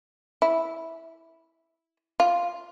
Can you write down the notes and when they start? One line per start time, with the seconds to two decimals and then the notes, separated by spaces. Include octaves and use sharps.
0.42 E4
2.20 F4